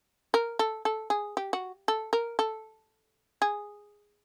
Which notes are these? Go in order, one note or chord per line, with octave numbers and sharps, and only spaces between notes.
A#4
A4
A4
G#4
G4
F#4
A4
A#4
A4
G#4